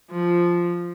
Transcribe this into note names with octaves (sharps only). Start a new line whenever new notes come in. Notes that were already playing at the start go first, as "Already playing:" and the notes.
F3